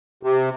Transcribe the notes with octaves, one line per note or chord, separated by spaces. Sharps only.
C3